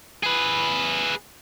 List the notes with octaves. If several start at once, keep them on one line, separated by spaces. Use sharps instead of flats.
G#4 B4